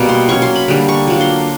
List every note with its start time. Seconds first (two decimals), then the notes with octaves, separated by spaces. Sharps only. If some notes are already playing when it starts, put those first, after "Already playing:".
Already playing: B2 G3 A#3
0.09 C6
0.29 F#3 A#3 C#4 C#6
0.42 C6
0.55 B5
0.68 D3 G3 A#3
0.88 C#6
1.07 F#3 A#3 D4 F4
1.21 C6